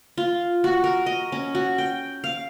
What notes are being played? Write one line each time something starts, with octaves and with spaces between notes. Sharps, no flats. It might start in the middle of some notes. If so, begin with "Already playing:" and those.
F4
F#4
A#4
D#5
C#4
F#4
G5
F5